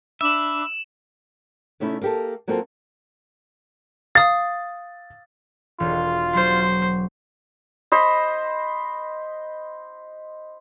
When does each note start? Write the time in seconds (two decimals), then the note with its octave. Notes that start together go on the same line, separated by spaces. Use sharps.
0.21 D4 E5 B5 D6 E7 F#7
1.80 C3 A3 C#4 D#4 E4
2.02 A#3 G4 A4
2.48 F#3 A#3 C4 F4 F#4 A4
4.15 F5 D#6 A6
5.80 E1 F4
6.34 F#3 C5
7.92 C5 D#5 B5